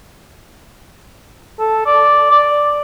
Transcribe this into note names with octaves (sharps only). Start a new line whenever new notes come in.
A4
D5
D5